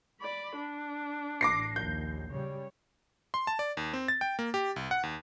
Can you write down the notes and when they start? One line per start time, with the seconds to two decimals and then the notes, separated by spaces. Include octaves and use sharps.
0.20 D5 B5
0.56 D4
1.41 A1 D6 A#6 C7
1.76 A#1 D#2 G6
2.31 C#3 G3 C#5
3.34 C6
3.47 A5
3.59 D5
3.77 D#2
3.93 C4
4.08 A6
4.21 G5
4.39 A#3
4.54 G4
4.76 C2
4.91 F#5
5.03 D#2